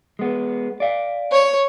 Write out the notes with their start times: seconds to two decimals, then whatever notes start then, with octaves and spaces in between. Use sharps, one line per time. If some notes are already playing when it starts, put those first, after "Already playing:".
0.19 G#3 B3
0.80 D5 F5
1.32 C#5